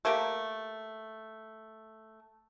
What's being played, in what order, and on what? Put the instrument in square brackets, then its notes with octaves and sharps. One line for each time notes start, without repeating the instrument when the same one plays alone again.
[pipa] A3 A#3 G4 A#4